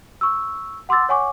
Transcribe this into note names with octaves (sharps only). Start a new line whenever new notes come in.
C#6 E6
F#5 C6 D6 E6 A6
C#5 F#5 G#5 C#6 D6